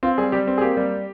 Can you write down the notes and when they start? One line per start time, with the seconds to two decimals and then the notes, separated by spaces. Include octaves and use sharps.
0.03 C4 F4
0.18 G3 G#4
0.32 G3 G4
0.47 C4
0.58 G#4
0.61 A#3 G4
0.77 G3